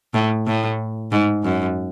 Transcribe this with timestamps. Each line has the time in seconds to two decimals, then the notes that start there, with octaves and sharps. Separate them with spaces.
0.14 A2
0.47 A2
1.12 G#2
1.44 F#2